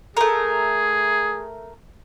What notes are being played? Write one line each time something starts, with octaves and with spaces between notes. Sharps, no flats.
A3 G#4 A#4